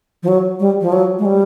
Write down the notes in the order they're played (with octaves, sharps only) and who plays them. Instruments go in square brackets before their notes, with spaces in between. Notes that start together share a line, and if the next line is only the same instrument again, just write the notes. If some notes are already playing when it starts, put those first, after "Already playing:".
[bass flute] F3
F#3
G3
F3
F#3
G#3
G3